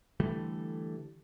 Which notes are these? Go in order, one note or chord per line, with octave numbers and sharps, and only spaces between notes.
D3 E3 G3 A3